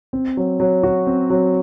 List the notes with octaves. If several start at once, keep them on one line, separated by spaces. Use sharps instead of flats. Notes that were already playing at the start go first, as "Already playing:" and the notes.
C4
F#3
F#3
F#4
C4
F#3